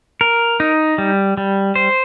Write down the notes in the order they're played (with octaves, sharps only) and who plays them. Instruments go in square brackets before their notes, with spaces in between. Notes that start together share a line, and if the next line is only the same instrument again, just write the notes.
[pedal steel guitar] A#4
D#4
G3
G3
C5